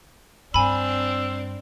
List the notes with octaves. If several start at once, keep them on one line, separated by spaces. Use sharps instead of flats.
G2 C4 D4 G#5 B5 E6